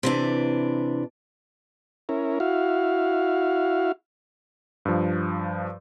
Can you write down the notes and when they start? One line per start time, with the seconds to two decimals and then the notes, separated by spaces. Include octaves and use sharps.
0.03 C3 E3 D4
2.09 C#4 E4 A#4
2.40 E4 F#4 F5
4.85 G2 F3